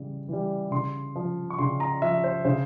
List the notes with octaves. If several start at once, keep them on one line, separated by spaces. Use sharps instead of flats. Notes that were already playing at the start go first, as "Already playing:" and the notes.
Already playing: C#3 E3 G3
E3 G3
C#3 C6
F3
C#6
C#3 C6
A#5
F3 E5
C5
C#3 C5